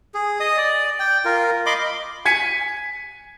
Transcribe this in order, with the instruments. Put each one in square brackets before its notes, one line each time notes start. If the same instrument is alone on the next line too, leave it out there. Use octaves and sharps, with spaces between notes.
[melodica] G#4
D#5 D#6
D5
G5
F4 A#4
D#5 B5 C6 D6
[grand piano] G#5 G#6 B6 C#7 D#7